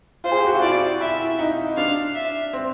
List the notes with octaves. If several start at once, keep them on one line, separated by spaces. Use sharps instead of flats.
F4 C5
G#4
G4
F#4
F4
E4 D5
E4 E5
D#4
D4 F5
E5
C4